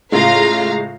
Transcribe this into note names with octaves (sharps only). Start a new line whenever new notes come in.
A2 C#3 G#3 F4 F5 A#5